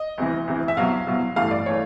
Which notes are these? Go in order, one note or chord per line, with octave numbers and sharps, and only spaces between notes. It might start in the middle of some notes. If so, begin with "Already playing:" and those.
Already playing: D#5
D2 C3 E3
D2 C3 E3
E5
C2 B2 F#3 F5
C2 B2 F#3
A1 G2 E3 A3 F5
D5
E3 A3 C#5